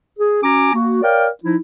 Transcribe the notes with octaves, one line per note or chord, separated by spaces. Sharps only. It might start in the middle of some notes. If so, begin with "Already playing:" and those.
G#4
C#4 F#4 G#5 A#5 D6
A#3 F#4
A#4 C#5 D5 F5 G5
F3 D#4 E4